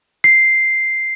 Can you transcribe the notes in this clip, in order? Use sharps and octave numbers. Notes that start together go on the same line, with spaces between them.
C7